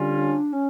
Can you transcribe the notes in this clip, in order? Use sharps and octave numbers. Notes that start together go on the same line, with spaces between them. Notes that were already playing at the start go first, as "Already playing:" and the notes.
Already playing: D3 G3 C#4 F4
D4
C#4